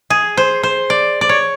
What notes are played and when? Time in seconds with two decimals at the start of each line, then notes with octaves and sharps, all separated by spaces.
0.10 G#4
0.37 C5
0.63 C5
0.90 D5
1.21 D5
1.29 C#5